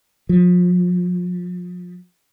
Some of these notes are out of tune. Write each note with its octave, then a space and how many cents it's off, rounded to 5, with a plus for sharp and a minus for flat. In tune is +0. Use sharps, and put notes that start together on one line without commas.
F3 +35